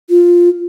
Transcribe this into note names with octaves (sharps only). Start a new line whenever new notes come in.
F4